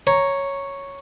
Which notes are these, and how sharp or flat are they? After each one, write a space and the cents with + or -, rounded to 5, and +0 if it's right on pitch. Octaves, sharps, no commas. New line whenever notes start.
C#5 +0 A#5 +0